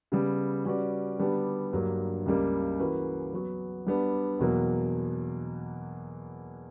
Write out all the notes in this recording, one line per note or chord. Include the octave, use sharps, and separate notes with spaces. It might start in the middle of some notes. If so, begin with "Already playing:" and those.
C#3 G3 B3
G3 C#4 F#4 B4 D5
D3 G3 B3 D4 G4
G2 F#3 A#3
C#2 C#3 G3 A#3
E3 A#3 C#4 F#4 B4
F#3 B3 F#4
G3 B3 D4
E2 B2 F#3 A#3